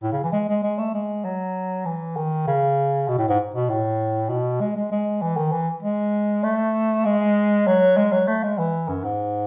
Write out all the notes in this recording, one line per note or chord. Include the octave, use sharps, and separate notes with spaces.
A2
C#3
E3
G#3
G#3
G#3
A3
G#3
F#3
E3
D#3
C#3
B2
A2
G#2
B2
A2
B2
G#3
G#3
G#3
E3
D#3
E3
G#3
A3
G#3
F#3
G#3
F#3
A3
G#3
E3
F#2
G#2